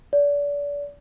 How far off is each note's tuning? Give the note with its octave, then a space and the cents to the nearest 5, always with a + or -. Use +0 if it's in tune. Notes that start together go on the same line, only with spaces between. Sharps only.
D5 -35